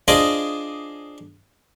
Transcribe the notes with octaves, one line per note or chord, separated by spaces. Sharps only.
D4 F4 G#4 C5 D5 D#5